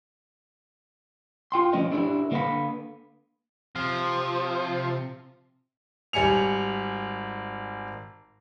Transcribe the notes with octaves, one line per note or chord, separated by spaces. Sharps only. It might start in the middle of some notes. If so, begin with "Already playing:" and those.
F4 G5 C6
F3 A3 C#4 D4 A#4 D#5
D4 E4 G4 A#4 D5
D3 A#3 B4 E5 F5 B5
C3 F3
G#1 G3 G#5 C#7 F7